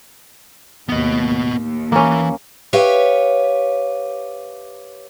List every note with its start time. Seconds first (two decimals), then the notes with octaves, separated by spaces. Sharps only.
0.89 D#2 A2 B3 D#5
1.53 D#2
1.92 E3 A#3 C#4
2.73 G4 B4 C#5 E5 F5